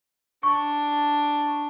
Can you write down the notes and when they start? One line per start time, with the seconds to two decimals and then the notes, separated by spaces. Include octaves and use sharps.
0.43 D4 C#6